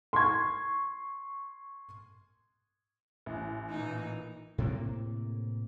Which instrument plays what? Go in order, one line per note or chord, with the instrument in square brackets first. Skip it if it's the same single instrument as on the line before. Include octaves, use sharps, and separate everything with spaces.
[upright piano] C6 C#6 G#6
[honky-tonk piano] A1
[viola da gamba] A#2 E3 D#4
[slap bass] A2 C3 A#3